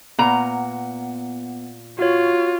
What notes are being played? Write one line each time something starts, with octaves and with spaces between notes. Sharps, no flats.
A#2 B3 F#5 A#5
F4 F#4 C#5